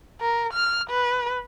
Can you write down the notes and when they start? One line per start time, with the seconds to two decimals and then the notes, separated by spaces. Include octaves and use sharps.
0.21 A#4
0.53 F6
0.90 B4